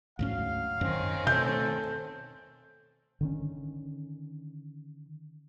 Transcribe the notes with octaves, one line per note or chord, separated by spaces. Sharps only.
D2 G#2 F#3 C#4 F5
F#2 D#3 C4 C#4
B2 A3 A4 G6
D3 D#3 C#4